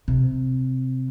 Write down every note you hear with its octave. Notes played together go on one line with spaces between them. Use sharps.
C3